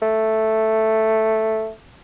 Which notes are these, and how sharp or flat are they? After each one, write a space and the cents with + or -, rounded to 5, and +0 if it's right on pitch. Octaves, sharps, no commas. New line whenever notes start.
A3 +0